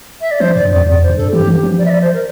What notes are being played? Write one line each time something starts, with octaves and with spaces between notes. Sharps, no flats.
E5
D5
F3 C5
G2 D5
F2 D5
F2 D5
C5
G2
A4
E3 G4
E3
G4
F3
D5
E5
D5
C5
A#4